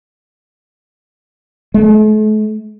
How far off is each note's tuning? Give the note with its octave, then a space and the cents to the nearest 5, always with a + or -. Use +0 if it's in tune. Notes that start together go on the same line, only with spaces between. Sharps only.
A3 -45